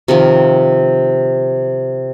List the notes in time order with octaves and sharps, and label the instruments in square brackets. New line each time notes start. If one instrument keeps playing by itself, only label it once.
[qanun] C3 D#3 F3